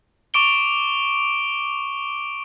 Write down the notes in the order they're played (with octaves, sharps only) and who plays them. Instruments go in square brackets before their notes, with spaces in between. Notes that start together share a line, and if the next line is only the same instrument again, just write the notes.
[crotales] C#6 D6 D7 G7